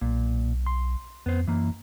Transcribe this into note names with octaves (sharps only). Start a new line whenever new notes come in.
B1 A#2
C6
F2 B3 C5
F#2 E3 A#3